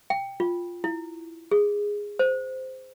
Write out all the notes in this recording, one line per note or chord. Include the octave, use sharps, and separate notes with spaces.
G5
F4
E4
G#4
C5